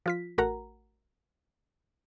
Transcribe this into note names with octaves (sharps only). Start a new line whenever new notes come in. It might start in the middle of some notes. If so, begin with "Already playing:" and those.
F3 F4 B6
A1 A3 F#4 A#4 F#5 A#5